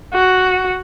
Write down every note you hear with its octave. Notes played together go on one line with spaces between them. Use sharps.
F#4